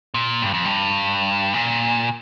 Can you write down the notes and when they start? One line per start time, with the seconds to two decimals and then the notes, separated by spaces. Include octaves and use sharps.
0.14 A#2
0.42 G2
0.54 F2
0.65 G2
1.53 A#2